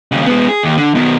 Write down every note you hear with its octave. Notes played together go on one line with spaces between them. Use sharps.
D#2 C#3
G#3 B3
G#4
D#2
D3
B2 D#3